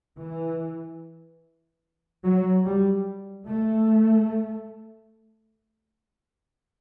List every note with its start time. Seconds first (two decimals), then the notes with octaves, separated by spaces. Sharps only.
0.19 E3
2.24 F#3
2.65 G3
3.46 A3